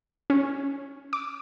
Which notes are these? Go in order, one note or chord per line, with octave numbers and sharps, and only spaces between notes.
C#4
D6